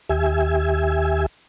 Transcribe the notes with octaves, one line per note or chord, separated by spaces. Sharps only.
D#2 G4 E5 G#5